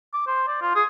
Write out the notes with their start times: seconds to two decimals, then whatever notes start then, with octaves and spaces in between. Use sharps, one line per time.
0.13 D6
0.27 C5
0.47 D5
0.62 F4
0.75 G#4